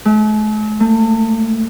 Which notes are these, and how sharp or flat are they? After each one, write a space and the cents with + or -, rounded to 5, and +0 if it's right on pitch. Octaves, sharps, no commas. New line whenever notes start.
A3 -45
A3 +35